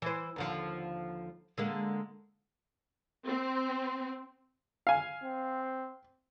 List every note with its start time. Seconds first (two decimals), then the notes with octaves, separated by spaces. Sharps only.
0.02 E3 C5
0.36 D#2 D3 F3
1.58 D3 G#3 A#3
3.25 C4
4.87 F5 G#5
5.24 C4